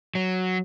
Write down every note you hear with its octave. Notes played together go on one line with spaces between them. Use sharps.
F#3